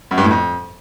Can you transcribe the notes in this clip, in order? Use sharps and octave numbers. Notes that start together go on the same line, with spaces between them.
F#2
G2
A2
F2